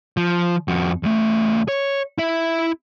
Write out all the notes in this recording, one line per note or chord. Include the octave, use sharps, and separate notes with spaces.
F3
F2 F#4
E2 A3
C#5
E4 E5